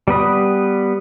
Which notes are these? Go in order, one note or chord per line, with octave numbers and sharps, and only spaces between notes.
G3 B3 B4 D#6